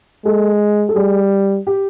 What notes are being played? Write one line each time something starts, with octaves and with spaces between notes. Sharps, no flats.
G#3 A4
A4
G3 G#4
G4